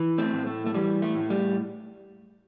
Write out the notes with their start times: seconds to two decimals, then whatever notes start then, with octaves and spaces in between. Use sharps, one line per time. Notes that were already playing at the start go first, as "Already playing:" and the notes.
Already playing: E3
0.18 A3 C4
0.33 A2
0.46 A3
0.66 A3
0.74 E3 G3
1.02 A3
1.15 A2
1.30 G3